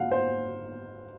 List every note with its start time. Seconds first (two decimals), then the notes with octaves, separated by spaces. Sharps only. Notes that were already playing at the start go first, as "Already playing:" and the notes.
Already playing: F5 F#5
0.11 C5